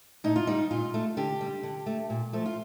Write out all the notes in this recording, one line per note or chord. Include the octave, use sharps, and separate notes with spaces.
A2 D#4
F4
G3 D#4
A#2 F4
A3
D3 G4
G3
D3
A3
A#2
F3 A3
F4